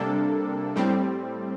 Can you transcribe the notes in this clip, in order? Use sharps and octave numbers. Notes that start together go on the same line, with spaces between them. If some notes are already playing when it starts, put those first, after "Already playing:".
Already playing: C3 G3 A#3 D4 A4
A2 G3 C4